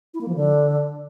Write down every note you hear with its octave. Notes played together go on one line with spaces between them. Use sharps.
E4
A#3
F3
D3